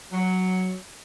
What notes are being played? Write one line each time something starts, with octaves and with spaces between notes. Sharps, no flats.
F#3